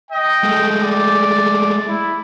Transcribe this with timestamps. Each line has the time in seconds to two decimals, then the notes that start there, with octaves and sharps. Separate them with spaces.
0.11 D#5 G5
0.44 G#3 A3
0.80 D5
1.88 E4